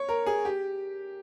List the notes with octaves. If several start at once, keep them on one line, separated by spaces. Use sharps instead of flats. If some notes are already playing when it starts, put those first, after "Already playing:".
Already playing: C#5
A#4
G#4
G4